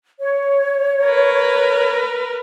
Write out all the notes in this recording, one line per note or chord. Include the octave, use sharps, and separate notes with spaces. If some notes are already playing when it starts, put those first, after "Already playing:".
C#5
A#4 B4